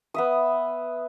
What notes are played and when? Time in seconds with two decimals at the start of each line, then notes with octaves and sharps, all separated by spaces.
0.14 B3 E5 D#6